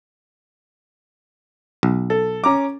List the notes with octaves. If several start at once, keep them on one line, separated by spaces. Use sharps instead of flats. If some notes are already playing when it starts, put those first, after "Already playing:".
B1
A4
C#4 A#5 D6